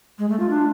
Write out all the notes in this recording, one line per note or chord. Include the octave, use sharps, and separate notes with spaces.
G#3
A3
F4
D4